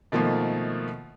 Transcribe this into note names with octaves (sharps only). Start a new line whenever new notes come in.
B2 D#3 F3 A3 A#3